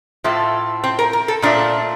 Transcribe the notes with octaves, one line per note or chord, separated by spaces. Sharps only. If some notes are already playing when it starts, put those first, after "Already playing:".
A2 F3 A3
C4
A#4
A#4
A4
A#2 F3 A3 D4